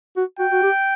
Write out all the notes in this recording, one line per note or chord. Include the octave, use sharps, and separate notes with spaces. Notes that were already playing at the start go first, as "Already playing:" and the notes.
F#4
F#4 G5
F#4
G4